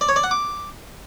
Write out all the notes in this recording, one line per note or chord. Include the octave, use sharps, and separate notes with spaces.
D5
C#5
D5
F#5
D6